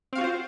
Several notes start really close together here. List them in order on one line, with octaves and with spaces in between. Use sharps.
C4 F5 F#4 F4 C5